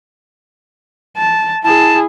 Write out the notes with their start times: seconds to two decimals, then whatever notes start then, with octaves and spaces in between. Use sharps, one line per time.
1.17 A5
1.64 E4 G#4 A5